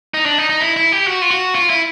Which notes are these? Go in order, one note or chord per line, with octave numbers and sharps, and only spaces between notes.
D#4
D4
D#4
D#4
E4
E4
G4
F#4
F4
F#4
F4
E4